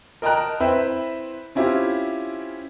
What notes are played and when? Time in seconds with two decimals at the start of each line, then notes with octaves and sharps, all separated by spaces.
0.22 A#4 D#5 G5 A5 A#5 F#6
0.60 C4 E4 B4 C5 E5 G5
1.55 C4 C#4 E4 F4 G4